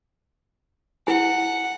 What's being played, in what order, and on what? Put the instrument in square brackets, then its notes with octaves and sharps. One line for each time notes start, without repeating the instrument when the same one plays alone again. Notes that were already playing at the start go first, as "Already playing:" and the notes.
[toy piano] E4 G#5 [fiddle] F#5